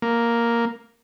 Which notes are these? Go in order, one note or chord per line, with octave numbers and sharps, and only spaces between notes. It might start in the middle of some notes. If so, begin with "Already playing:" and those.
A#3